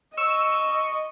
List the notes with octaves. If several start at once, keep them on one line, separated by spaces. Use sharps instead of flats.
D#5 C#6 E6